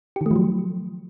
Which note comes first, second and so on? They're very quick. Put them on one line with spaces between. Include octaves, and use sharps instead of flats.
G4 D#3 A3 F3 F#3